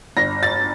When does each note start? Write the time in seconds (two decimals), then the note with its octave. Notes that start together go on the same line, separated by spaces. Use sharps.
0.17 G1 A#6
0.43 A6